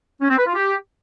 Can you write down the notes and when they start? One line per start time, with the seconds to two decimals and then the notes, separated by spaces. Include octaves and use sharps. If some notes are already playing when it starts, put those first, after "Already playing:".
0.21 C#4
0.30 C4
0.38 B4
0.46 F4
0.55 G4